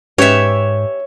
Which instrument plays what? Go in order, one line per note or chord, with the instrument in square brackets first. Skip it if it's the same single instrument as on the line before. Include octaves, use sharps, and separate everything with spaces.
[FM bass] G#2 [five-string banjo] C#4 G4 B4 [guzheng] C#5 E5